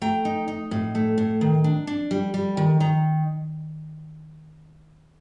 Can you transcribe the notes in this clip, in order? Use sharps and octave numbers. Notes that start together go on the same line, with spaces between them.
A3 G5 A#5
D#4
D#4
A2
A3
A2
D#3
D4
D4
G3
G3
D#3
D#3 A#5